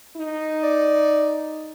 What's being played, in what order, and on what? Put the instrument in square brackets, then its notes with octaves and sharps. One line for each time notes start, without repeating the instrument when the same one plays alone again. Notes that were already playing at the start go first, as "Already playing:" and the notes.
[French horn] D#4
[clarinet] D5